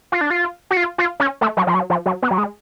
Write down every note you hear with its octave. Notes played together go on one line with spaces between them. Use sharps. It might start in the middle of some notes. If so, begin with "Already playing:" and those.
F4
D4
F4
F#4
F4
F4
C#4
A3
F#3
F3
F#3
F3
F#3
B3
F#3
G#3